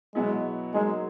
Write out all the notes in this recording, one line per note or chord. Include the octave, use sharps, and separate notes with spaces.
B2 F#3 G#3 B3 E4
F#3 G#3 A#3 D#4 G#4